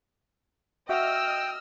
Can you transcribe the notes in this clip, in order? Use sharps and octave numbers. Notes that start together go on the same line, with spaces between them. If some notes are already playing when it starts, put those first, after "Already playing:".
F#4 D#5 E5 G5 E6 F6